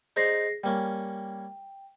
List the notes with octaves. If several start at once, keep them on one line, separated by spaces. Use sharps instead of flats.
D#4 G#4 C5 D5 A#6 C7
G3 A#3 C#4 G5